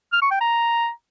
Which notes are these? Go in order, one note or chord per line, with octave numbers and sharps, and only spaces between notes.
F6
C#6
G5
A#5